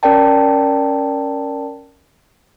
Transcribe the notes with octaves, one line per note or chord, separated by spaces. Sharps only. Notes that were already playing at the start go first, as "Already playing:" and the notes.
C#4 A#4 D5 G5 A5